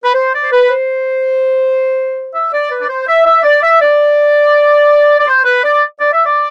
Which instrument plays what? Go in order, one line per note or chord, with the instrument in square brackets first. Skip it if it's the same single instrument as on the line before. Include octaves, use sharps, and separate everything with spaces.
[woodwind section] B4
C5
D5
C5
B4
C5
E5
D5
B4
D5
C5
E5
E5
D5
E5
D5
D5
C5
B4
D5
D5
E5
D5